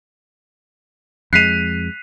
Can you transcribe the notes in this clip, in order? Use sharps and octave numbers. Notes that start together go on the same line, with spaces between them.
F2 G#3 F#6 B6 C7 D#7 F7